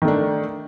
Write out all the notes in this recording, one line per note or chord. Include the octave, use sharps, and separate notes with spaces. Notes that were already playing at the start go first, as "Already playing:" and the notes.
D#3 A3 D4